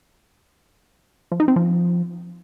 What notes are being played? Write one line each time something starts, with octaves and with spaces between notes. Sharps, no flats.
F3
D#4
C4
F3